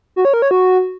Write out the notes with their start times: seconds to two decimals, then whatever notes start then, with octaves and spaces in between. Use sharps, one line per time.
0.16 F#4
0.25 C#5
0.34 A#4
0.42 C#5
0.51 F#4